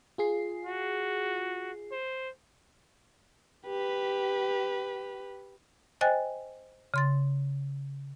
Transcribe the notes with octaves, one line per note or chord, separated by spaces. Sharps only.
F4 G#4 C7
F#4
C5
G4 B4
C5 D#5 G5 G#5 F#6 A6
C#3 C6 A6